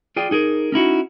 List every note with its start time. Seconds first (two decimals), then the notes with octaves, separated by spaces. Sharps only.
0.16 F4 G#4 D5 G5
0.31 D#4 G#4 A#4
0.72 C#4 D#4 E4 F#4